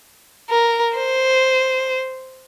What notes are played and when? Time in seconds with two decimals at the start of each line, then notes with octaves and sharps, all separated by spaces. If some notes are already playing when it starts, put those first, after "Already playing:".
0.50 A#4
0.97 C5